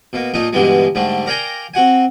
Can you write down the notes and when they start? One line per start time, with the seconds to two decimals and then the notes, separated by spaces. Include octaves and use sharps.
0.13 B2 A#3
0.34 A#2 A3 A#3 D#4
0.53 G2 B2 D3 E3 G3 G#3
0.95 G#2 D3 G3 A3
1.26 A#4 D5 F5 G5 G#5 A#5
1.74 C4 F#4 F#5 G#5